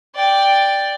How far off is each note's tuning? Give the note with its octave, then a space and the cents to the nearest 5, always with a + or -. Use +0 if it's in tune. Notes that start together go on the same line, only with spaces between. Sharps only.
D5 +0 G5 +0